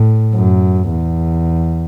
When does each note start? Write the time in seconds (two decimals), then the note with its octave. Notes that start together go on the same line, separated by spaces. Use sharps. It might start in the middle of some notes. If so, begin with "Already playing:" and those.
Already playing: A2
0.35 F#2
0.89 E2